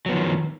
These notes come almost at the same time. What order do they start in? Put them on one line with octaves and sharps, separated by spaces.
F#3 B3 F3 D#3